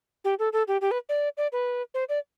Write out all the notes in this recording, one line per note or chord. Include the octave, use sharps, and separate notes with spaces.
G4
A4
A4
G4
G4
B4
D5
D5
B4
C5
D5